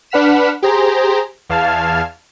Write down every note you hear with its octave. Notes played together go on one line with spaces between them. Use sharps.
D4 B4 F#5 F6 B6 E7
G4 G#4 C5 A#5
E2 F5 A5 F6 G#6